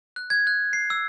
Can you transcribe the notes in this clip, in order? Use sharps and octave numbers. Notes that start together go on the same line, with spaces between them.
F#6
G#6
F#6
C7
E6